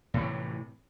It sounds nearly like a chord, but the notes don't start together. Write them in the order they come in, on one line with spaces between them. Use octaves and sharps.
A2 E3 C3